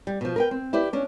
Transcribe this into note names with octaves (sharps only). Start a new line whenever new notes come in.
G3
B2 F3
A#4 B4 G5
C4
E4 G4 B4 D5
C#4 D4